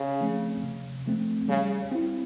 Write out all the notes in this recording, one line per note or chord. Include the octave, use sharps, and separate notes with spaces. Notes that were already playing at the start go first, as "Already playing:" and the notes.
Already playing: C#3
F3 A3 C4
C3
F3 A3 C4
C#3 G3
C4 E4